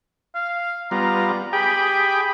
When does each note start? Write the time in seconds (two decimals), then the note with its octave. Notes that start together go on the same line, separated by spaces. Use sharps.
0.35 F5
0.91 G3 B3 F4 A#5
1.53 G4 G#4 G5 B5